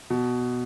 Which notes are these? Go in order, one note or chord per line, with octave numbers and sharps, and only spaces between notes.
B2